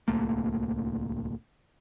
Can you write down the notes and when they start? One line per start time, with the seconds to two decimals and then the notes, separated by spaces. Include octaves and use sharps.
0.08 D1 C2 A3 A#3